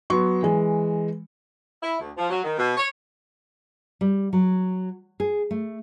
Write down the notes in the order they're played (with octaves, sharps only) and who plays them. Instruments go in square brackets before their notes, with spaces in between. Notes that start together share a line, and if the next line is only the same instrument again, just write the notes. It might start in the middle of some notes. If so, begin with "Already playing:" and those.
[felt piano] F#3 B3 C6 C#6
E3 G#3
[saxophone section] E4
D2
F3
F#3
D#3
B2
C#5
[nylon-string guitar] G3
F#3
G#4
A3